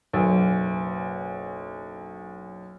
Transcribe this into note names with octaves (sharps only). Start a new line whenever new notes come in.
F#1 B1